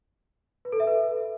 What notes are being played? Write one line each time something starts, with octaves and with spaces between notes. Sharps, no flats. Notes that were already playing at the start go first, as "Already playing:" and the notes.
B4
A4
E5
B4